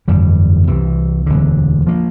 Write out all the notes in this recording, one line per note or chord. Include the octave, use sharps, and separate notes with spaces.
G1 F2 E3 G3
C2 C3 E3
E1 D2 D3
F3 A#3